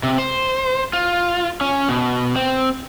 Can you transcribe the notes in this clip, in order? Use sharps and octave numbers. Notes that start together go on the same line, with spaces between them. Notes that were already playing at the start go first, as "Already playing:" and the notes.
C3
C5
F4
C#4
B2
C4